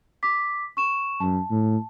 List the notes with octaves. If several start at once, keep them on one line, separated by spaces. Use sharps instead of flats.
D6 B6
C#6 E7
F#2 A5
A2